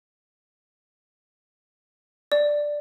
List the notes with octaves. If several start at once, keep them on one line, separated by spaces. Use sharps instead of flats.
D5